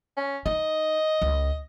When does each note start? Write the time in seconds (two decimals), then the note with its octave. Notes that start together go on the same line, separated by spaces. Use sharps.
0.17 C#4
0.46 D#4 D#5
1.22 C#2